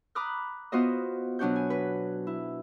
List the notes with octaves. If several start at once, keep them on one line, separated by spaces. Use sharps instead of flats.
A#5 B5 D6 D#6 F6 F#6
B3 F4 F#4 C5 D#5
B2 F#3 D4 F#4 G6
G#5
B4
E4